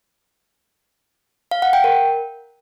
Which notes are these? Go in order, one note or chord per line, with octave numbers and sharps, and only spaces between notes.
F5
F#5
G5
A#4